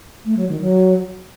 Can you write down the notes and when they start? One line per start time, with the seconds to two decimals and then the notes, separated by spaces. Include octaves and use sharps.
0.25 A3
0.37 F#3
0.49 D#3
0.60 F#3